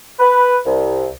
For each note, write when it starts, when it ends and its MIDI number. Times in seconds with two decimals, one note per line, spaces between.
0.19 0.57 71
0.65 1.07 36